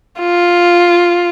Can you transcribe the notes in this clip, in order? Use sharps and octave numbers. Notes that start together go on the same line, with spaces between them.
F4